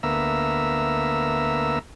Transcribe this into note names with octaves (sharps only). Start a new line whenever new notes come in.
D2 A#3 B3 E5 A#5 E6